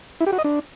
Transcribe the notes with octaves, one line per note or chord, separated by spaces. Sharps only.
E4
G4
F#4
D#5
D4